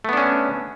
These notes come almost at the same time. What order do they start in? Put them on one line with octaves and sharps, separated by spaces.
A3 B3 D4 C#4